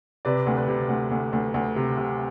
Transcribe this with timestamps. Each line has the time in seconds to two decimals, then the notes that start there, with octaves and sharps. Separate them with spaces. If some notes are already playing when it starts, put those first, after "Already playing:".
0.25 C3 B4 D5
0.47 D2
0.57 B4
0.68 C3
0.89 D2
1.12 D2
1.33 D2
1.54 D2
1.76 C3
1.97 C3